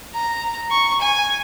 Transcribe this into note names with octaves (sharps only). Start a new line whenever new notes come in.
A#5
C#6
G#5